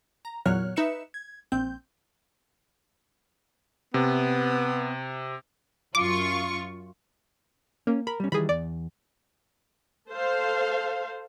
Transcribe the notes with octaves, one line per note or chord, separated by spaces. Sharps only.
A#5
E2 A#2 F#3 C#5 F6 F#6
D#4 B4 E5 C#7 E7
G#6
A#1 C4 G6
C3 B3
F#2 F4 C#6 D6
A#3 C#4
A#4 B5
G3 C#4
D#3 E3 G3 G#4 B5
E2 D5
A4 C5 F5